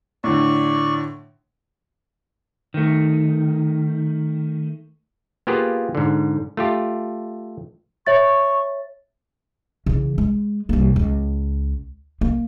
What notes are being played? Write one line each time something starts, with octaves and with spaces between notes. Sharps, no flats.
A2 D3 D5 C#6
D#3 A3
A#3 B3 F4 G4 G#4
G#2 D3
A3 F4 G4
C#5 E5 C#6 A6
C#3 E3
G#3
C2 A#3
C#2
A#3